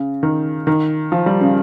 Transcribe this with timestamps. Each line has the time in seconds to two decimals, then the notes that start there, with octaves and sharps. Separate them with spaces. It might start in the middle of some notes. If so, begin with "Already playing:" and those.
Already playing: C#3
0.23 D#3
0.67 D#3
1.12 F3
1.26 G3
1.41 C#3